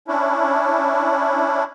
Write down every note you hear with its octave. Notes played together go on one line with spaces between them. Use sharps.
C#4 D4 E4